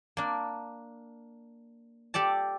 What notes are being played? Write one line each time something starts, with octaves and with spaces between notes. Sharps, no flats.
A#3 D4
G4 A4 D5 A5